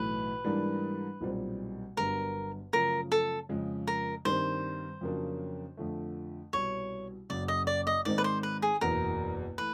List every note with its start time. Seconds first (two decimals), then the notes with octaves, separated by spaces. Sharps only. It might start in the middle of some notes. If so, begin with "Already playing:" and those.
Already playing: B1 A2 E3 A3 B4
0.44 G#2 E3 G3 A#3 D4
1.21 B1 A#2 G3 C4
1.97 G1 G2 D3 F#3 B3 A#4
2.73 F#2 C#3 F3 A3 A#4
3.12 A4
3.49 F2 C#3 F3 G#3
3.87 A#4
4.25 G2 D#3 G3 C4 C5
5.01 F2 C#3 F#3 A#3 D4
5.77 F2 D3 F3 A3
6.53 C2 B2 G3 C#5
7.30 F#1 F#2 C#3 D5
7.48 D#5
7.67 D5
7.87 D#5
8.05 G#2 D#3 G#3 C4 D#4 D5
8.18 B4
8.24 C5
8.43 B4
8.62 G#4
8.81 F#1 E2 B2 A#4
9.58 E3 A3 B4